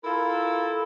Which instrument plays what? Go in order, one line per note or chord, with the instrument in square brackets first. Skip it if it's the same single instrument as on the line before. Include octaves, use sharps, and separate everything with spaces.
[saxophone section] E4 F4 A4 A#4